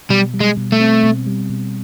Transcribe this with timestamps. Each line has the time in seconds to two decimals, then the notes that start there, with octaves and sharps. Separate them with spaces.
0.10 B2 G3
0.34 G3
0.40 G#3
0.57 B2
0.72 A3
0.80 C4
1.04 B2
1.27 G3
1.50 B2